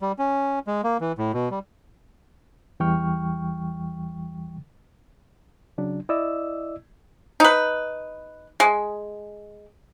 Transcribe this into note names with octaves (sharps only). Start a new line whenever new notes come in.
G3
C#4
G#3
A#3
E3
A2
B2
G3
E2 E3 G3 G5 C#6 F6
C#3 F#3 D4
E4 D5 D#5 E6
D#4 B4
G#3